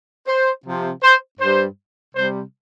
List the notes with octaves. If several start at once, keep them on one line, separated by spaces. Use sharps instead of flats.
C5
C3 F3
C5
G2 G3 C5
C3 G3 C5